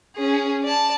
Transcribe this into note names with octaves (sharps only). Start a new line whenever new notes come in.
C#4 G#4
D5 A5